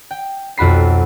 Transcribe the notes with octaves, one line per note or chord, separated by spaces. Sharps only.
G5
B1 F2 F#4 B5 C7